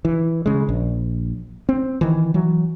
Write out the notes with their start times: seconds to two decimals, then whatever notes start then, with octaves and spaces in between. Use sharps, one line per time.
0.05 E3
0.46 C#3 G#3
0.69 A#1
1.69 C4
2.01 D#3 E3
2.34 E3 F#3